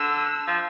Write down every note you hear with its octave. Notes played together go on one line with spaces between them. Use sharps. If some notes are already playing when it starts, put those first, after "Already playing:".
Already playing: D3 E6
F3